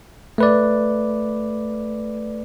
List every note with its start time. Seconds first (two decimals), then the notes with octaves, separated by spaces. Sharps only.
0.38 A3 B4 D5